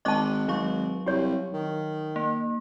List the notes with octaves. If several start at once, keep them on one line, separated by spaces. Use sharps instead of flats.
G#1 D#5 A5 C#6 D6 F#6
G#1 F#3 F5 C#6
C2 G4 C#5
D#3
A#3